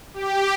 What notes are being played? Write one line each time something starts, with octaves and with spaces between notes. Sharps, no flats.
G4